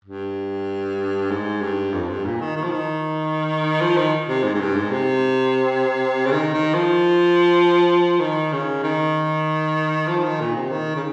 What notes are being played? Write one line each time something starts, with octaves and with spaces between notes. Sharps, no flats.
G2
G#2
G2
F2
G2
A#2
D#3
D#3
F3
D#3
F3
D#3
C3
G#2
G#2
G2
G#2
C3
C#3
D#3
D#3
F3
D#3
C#3
D#3
F3
D#3
A#2
C3
D#3
C#3